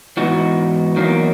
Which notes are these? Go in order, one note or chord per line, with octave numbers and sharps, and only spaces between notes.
G#2 E3 B3 D#4 F#4
E2 D#3 F#3 A#3